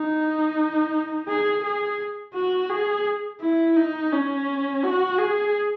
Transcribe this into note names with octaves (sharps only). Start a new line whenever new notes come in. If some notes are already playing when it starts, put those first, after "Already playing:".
Already playing: D#4
G#4
G#4
F#4
G#4
E4
D#4
C#4
F#4
G#4